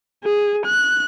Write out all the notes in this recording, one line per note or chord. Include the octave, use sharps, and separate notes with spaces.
G#4
F#6